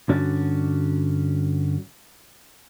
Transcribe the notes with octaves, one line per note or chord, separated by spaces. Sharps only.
G2 D3 C#4 F#4 D5